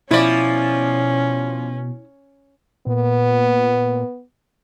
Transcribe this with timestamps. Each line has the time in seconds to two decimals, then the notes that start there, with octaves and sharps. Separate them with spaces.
0.11 B2 F3 C#4 E4 D5
2.87 A#2 B3